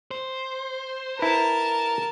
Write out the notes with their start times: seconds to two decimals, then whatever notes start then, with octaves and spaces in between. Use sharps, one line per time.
0.11 C5
1.19 E4 A#4 B4 A5